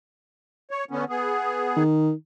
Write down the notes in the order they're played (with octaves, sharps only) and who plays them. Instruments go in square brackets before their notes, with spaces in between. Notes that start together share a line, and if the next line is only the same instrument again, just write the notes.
[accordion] C#5
D3 B3 C#4
B3 G#4
[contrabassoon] D#3